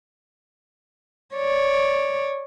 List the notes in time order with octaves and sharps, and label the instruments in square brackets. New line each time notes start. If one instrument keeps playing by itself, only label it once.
[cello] C#5 D5